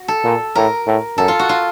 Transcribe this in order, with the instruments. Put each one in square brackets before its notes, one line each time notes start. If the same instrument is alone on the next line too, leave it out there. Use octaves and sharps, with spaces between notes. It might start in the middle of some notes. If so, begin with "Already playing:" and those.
Already playing: [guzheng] F#4
A4
[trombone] A#2
[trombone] A2 [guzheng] A#4
[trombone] A2
[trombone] F#2 [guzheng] A4
[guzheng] F4
F#4
F4